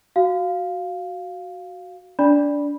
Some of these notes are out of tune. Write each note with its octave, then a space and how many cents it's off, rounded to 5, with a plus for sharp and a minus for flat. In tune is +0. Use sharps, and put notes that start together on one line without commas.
F#4 +0 F5 +0
D4 -25 D5 +0 B5 -10